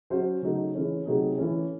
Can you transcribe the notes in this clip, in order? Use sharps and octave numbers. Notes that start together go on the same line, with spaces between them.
F#3 C#4 F#4 C5
C#3 F#3 A3 D#4
E3 A3 C#4 G#4
C3 F#3 A3 D#4 G#4
E3 A3 C#4